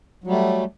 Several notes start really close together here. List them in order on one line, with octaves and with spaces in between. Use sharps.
F#3 G3 A3